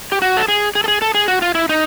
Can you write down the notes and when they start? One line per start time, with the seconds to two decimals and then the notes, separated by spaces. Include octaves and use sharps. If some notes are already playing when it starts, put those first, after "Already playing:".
0.12 G4
0.22 F#4
0.37 A4
0.48 G#4
0.75 G#4
0.84 A4
0.88 G#4
1.02 A4
1.15 G#4
1.28 F#4
1.42 F4
1.55 E4
1.69 D#4